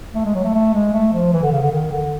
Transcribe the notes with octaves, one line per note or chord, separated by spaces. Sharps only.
A3
G#3
F#3
A3
A3
G#3
A3
F3
E3
D3
C#3
D3
D#3
D3